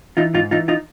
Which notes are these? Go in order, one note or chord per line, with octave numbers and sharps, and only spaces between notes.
E3 D#4 F4
G#2 D#4 F4
E3 D#4 F4
D#4 F4